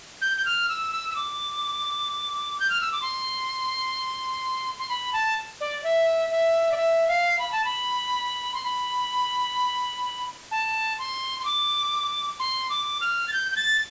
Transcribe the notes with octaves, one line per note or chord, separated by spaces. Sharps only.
G6
G6
F6
E6
E6
E6
D6
G6
F6
E6
D6
C6
C6
B5
A5
D5
E5
E5
D5
E5
F5
B5
A5
B5
C6
B5
A5
C6
C6
D6
C6
D6
F6
A6
G6
G6
A6